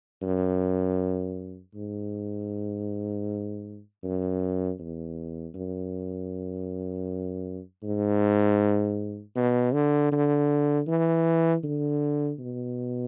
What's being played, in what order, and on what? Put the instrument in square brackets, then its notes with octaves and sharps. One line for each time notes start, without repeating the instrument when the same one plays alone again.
[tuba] F#2
G#2
F#2
E2
F#2
G#2
B2
D3
D3
E3
D3
B2